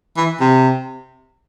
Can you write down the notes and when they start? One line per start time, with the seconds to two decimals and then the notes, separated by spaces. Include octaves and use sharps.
0.17 E3
0.40 C3